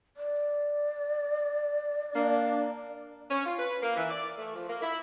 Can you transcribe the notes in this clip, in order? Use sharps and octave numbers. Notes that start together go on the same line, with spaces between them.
D5
A#3 D4
C#4
F4
B4
A#3
E3
D5
A3
F3
A#3
E4